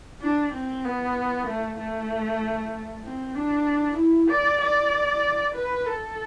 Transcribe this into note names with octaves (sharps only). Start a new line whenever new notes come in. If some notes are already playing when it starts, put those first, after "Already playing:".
D4
C4
B3
A3
A3
C4
D4
E4
D5
D5
B4
A4